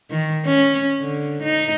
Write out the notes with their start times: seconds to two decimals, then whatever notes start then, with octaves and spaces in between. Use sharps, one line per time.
0.10 D#3
0.45 C#4
1.01 D3
1.43 D#4